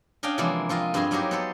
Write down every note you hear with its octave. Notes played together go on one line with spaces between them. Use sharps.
C#4 D4 D#5 F5 G5
C3 E3 F3 G#3 A#3 D4
F3 C4 F4 D#5
G2 B3 C4 G#4 D#5 C6
F#3 A#3 C4 D#4 G4 G#4
B3 A4 C5